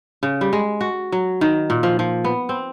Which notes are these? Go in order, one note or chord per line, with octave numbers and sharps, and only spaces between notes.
C#3
G3
G#3
F#4
F#3
D#3
A#2
F3
F3
B3
C4